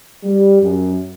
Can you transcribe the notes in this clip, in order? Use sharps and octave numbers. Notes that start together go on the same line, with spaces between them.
G3
F#2